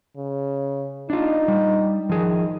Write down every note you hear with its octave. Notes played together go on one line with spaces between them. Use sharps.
C#3
D4 D#4 F4
G3
D#3 F3 G#4